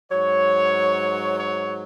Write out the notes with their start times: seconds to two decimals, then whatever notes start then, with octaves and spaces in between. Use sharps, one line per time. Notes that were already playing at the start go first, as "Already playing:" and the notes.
0.11 G#2 F#3 C#5
1.39 C#5